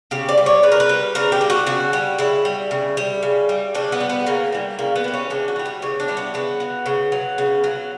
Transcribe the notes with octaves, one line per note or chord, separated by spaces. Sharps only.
C#3 G4
D5
G3
C#5
C#3 B4
A#4
B4
G3
C#3 A#4
G4
G3
F#4
C#3 F#4
G3
C#3 E4
G3
C#3
G3
C#3
G3
C#3 D4
B3
G3
B3
C#3 A#3
E3 G3
C#3 A#3
B3
E3 G3
C#4
C#3 D4
F#4
E3 G3
G4
C#3 C#5
D4
E3 G3
B3
C#3 B3
F#3
C#3
F#3
C#3
F#3